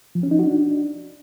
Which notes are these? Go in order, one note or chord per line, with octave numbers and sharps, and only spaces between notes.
F3
C#4
D#4
F#4
D4